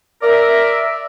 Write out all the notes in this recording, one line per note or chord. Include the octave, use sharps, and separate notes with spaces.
A#4 D5 E5